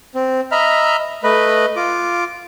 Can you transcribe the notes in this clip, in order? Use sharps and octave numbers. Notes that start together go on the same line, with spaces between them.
C4
D#5 E5 A#5 B5 F6
A3 B4 D#5 B5
F4 D6